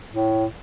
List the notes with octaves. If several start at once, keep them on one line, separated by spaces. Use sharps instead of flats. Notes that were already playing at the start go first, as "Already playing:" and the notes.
A2